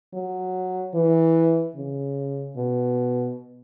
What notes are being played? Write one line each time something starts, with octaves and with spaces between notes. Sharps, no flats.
F#3
E3
C#3
B2